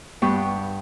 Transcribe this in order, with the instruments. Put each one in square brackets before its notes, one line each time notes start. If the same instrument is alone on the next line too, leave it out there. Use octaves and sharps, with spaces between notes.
[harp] G2 B3 G4 C#6